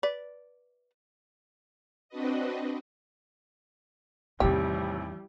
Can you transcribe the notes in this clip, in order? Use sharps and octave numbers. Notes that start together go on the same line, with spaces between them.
B4 D5
C4 D4 F#4 B4 D#5
A1 E2 C3 D#3 G3 G4